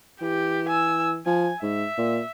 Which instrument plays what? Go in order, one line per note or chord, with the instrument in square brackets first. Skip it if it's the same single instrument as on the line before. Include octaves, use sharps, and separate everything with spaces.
[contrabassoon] E3 [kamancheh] G4
[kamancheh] G#5 E6
[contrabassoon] F3 [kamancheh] G#5
[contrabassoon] G#2 [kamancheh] E5
[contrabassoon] A#2